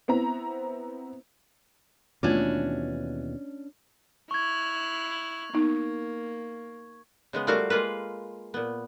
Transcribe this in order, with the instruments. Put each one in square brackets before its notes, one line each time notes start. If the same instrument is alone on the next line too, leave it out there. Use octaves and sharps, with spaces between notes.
[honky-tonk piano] B3 C4 E4 A#5
[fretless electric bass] D#2 B2 E3 [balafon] A3 F4 [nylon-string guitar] C#4 D4
[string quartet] E4 F6 F#6 [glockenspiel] C#6 G#6
[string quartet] A#3 [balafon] B3 D#4
[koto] C#3 G#3 B3
G3 A3 F4 F#4 A#4 F5
G#3 A#3 F4 B4
A#2 B3